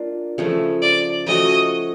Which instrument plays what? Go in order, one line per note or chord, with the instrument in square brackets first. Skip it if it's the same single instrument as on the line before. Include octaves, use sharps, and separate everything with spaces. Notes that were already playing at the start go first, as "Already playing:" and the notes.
Already playing: [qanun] A#3 D4 F4
C#3 F3 A3
[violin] D5
[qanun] F3 A3 C#4 F#4 [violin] D#5